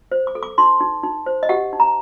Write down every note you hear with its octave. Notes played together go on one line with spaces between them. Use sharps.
C5
D6
A4
D6
D#4 C6
D#4
D#4
C5
D#5
G4 F#5
D#4
A#5